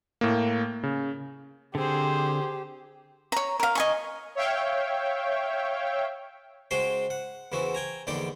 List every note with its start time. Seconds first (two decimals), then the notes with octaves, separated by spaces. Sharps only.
0.21 A2 A#3
0.83 C#3
1.75 D3 C4 G4 G#4 C5
3.32 C#5 A#5
3.60 A#4 F5
3.75 D#5 G#5 C#6
4.35 C#5 E5 F5 G5
6.71 C#3 G#3 F#4 C5 G5 C6
7.10 F#5
7.52 E2 C#3 E3 C4 F#4
7.75 G5 G#5 A#5
8.07 A#1 E2 D3 D#4 D5 G5